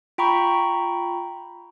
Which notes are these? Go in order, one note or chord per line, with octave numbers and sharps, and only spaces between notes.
F4 G5 A#5 B5 C#6